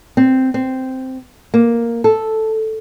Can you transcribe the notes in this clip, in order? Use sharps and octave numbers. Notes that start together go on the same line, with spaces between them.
C4
C4
A#3
A4